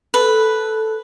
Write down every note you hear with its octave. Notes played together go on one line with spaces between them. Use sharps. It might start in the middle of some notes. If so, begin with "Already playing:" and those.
A4 B4